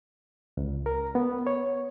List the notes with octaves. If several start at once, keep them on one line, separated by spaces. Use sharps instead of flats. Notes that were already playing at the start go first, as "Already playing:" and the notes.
C#2
A#4
B3
C#5